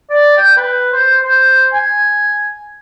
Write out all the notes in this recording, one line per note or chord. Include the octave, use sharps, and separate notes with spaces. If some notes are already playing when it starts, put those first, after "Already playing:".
D5
G5
B4
C5
C5
G#5